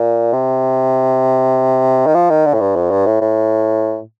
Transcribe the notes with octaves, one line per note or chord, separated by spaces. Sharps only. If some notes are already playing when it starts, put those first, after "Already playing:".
Already playing: A#2
C3
D#3
F3
D#3
D3
A2
G2
F2
G2
A2
A2